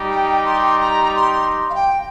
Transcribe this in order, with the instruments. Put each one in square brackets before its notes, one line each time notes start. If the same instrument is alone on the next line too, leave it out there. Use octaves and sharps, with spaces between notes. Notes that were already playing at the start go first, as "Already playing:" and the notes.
Already playing: [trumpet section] G3 D#4 G4
[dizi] G5
C6
A#5
C6
F5
G5